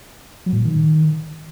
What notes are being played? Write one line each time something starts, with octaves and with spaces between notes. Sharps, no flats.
F#3
A2
A#2
D#3